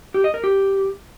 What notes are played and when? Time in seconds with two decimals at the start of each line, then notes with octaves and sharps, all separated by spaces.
0.14 G4
0.24 D#5
0.34 A#4
0.44 G4